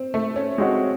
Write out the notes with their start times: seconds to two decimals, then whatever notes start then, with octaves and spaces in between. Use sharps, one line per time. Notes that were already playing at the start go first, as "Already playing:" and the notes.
Already playing: C4
0.14 A3
0.36 C#4
0.58 G#3 C4 F#4 C#5